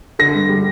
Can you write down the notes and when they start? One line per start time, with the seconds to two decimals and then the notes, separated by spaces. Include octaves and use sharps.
0.19 D3 A#6
0.35 G2
0.49 G3